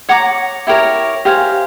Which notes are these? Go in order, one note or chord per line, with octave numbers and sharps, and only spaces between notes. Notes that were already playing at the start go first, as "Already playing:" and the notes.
C#5 F#5 A#5 D6
E4 G4 A#4 C#5
G4 C5 F5 G#5